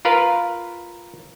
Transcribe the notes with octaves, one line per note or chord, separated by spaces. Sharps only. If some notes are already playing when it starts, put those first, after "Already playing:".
F4 A#4 B4 F5